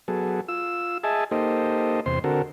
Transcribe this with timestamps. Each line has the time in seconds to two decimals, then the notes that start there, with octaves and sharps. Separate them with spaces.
0.08 F#3 B3 G#4 A4
0.48 F4 E6
1.04 G#4 D#5 E5 G#5 A5
1.31 A#3 D#4 G4 A4 C5 D#5
2.06 E2 C3 C5 C6
2.24 D3 C4 F#4 A4 A#4